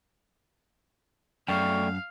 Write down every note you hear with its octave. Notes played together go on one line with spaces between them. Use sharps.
F#2 A3 D5 F5 G5 C#6